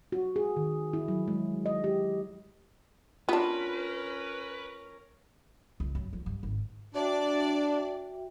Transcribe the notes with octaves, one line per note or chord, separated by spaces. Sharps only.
F#4
G#4
D#3
E4
F#3
G#3
D#5
G4
B3 C#4 D4 F4 F#4 A#4 B4
C#2
F#2
F3
G2
G#1
D4 F#4 D5 E5 G5